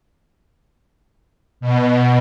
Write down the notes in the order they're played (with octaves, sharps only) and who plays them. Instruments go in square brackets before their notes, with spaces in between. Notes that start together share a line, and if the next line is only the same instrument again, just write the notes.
[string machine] B2